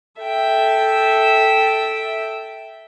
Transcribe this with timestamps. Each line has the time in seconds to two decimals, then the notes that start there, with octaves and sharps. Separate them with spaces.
0.20 A4 E5 G5